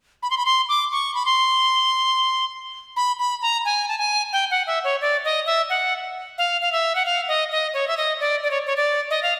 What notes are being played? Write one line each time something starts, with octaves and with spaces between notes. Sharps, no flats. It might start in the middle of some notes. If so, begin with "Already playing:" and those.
B5
C6
B5
C6
D6
C#6
B5
C6
B5
B5
A#5
G#5
A5
G#5
G5
F#5
E5
C#5
D5
D#5
E5
F#5
F5
F5
E5
F#5
F5
D#5
D#5
C#5
E5
D#5
D5
D5
C#5
C#5
D5
D#5
F5